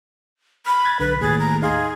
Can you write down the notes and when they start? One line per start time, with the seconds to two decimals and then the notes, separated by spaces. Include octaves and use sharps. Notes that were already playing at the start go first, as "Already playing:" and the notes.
0.66 B5 F6
0.85 F#6 G#6 A6
1.00 B1 D3 B4
1.21 D#2 A2 G#4 A6
1.39 A#5
1.62 D#4 G#4 F5 C6